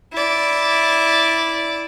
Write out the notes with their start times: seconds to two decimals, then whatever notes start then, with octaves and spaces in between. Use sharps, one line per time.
0.13 E4 D5